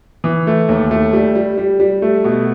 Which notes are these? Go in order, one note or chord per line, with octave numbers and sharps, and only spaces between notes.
E3
A3
D#2
A3
G3
G3
G3
G3
A3
B2